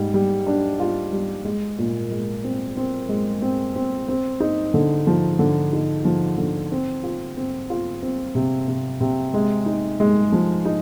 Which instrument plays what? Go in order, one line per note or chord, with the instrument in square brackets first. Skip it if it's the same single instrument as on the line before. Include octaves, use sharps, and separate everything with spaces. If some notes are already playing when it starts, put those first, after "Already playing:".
Already playing: [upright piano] G#2 G3
G3
D4
F4
G3
G#3
A#2
G#3
C4
C4
G#3
C4
C4
C4
D#4
D3
F3
D3
D#4
F3
D3
C4
F4
C4
F4
C4
C3
C3
C3
G#3
D#4
G#3
F3
D#4